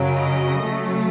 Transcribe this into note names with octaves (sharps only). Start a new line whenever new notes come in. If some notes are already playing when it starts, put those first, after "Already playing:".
Already playing: F#2 C#3 F#3
D#5
C#3 F#3 A3